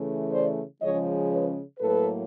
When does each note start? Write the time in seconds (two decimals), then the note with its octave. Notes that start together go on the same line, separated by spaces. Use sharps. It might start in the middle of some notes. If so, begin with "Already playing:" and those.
Already playing: C#3 E3 A3
0.32 C5 D5
0.81 C#3 F3 G#3 C#4 C#5 D#5
1.30 B4 C#5
1.79 A2 F#3 A#3 A4 B4